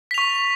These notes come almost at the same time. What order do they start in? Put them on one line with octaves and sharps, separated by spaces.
B6 F7 C#6